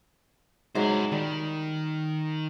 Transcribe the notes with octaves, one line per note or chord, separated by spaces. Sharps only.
G#2 F#3 E4 C5
D#3 G3